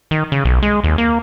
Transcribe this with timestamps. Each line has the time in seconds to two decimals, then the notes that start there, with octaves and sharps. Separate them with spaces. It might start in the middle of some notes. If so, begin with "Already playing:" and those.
0.11 D#3
0.32 C#3
0.45 B1
0.62 G#3
0.84 D#2
0.98 A#3